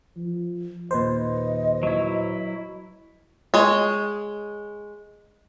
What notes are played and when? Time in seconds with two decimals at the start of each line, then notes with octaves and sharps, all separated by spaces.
0.17 F3
0.91 D#2 A#2 B4 C5 D#5
1.83 F#3 E4
3.54 G#3 C#5